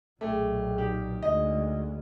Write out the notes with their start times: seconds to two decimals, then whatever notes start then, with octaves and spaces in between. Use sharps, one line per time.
0.21 B1 A#2 A3 G#4 G5 D6
0.78 D#4 G4
1.23 D2 G#3 D#5